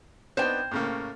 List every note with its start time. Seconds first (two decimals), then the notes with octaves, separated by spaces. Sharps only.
0.37 B3 D4 D#4 C5 G5
0.71 A2 C#3 A#3